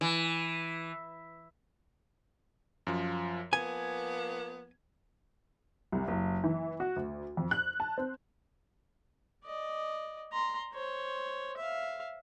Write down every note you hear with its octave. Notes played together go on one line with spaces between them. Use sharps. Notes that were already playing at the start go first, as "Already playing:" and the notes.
E3
F#2 F3
F3 A#3 B3 G#5 G#6
C2
F#1
E3
F#4
D2
F2
F#6
A5
C4
D5 D#5
A#5 C6
C5 C#5
E5 F5